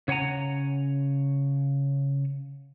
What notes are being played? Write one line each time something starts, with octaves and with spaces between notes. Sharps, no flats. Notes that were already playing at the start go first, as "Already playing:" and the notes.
C#3 C#5 F#5 G#5 A#5